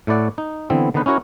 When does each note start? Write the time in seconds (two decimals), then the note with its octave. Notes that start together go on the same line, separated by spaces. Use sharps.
0.07 A2 A3 E4 D5 F#5
0.38 D#4
0.70 D3 E3 B3 C4 E4
0.94 D3 D#3 B3 D#4 B4 C5
1.06 C#4 E4 F#4 A#4 C#5